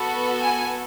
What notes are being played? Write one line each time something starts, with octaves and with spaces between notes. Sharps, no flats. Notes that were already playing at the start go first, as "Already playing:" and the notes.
Already playing: B3 F#4 A4
G#5